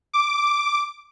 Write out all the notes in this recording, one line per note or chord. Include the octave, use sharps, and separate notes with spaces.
D6